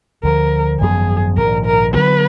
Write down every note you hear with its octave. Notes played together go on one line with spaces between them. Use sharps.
D2 D3 F3 A#4
G#1 F#2 F3 B3 G#4
A#1 G#2 D#3 A#4
A#4
D2 D3 F#3 B3 B4